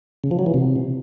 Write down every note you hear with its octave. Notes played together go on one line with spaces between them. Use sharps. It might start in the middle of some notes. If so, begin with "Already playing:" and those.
C#3
F3
F#3
E3
C3